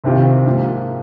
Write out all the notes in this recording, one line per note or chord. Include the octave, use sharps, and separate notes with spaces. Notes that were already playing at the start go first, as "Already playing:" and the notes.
C2 C3 D#3 C4 F4
G#2 F3 A#3